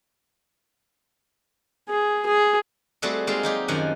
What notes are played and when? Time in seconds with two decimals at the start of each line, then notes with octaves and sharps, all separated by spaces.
1.89 G#4
2.26 G#4
3.02 G3 A3 C4 F#4 G#4 A4
3.27 G#3 A#3 C4 D#4 F4 G#4
3.43 F#3 D#4 G4
3.68 F#2 D#3 F3 F#5 G#5